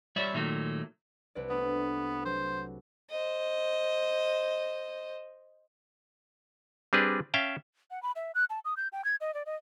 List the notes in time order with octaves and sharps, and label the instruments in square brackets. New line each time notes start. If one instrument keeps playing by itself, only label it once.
[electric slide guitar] G3 C#5 D5 E5
A#2 D#3 F#3 A3
[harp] C2 B4 D5
[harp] A3 D4 [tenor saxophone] B3
[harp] F#3 [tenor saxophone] C5
[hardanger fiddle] C5 D#5
[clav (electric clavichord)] G3 C4 D4 G#4 B4
C#4 E5 F5 G5 A5
[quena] F#5
B5
E5
F#6
A5
D#6
G6
G5
G#6
D#5
D5
D#5